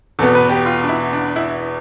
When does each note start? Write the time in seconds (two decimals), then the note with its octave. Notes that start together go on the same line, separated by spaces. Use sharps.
0.19 E2 B2 B3 A4
0.35 B4
0.50 G4
0.66 F4
0.84 D4
0.89 E4
1.13 D4
1.36 E4